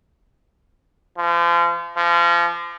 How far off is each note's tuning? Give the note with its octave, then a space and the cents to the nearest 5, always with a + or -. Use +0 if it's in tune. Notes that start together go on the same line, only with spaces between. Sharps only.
F3 -35
F3 -30